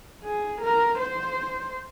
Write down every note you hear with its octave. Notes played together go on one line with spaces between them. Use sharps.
G#4
A#4
C5